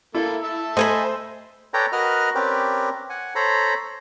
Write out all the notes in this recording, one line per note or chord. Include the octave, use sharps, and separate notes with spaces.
A#3 E4 A4
E5 A5 E6
A3 C5 D#5 G#5 B5
A4 B4 C#5 D5 G5 A#5
F#4 A#4 B4 D#5 F6
C4 C#4 G4 A#4 B4 D5
F#5 G#5
A4 C5 C#5 A#5 B5